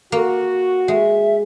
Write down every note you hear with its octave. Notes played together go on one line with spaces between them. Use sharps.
A#3 F#4
G#3 E5